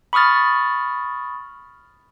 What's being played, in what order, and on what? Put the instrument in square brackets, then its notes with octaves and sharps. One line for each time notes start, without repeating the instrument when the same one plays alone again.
[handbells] B5 C#6 D#6 F6 A6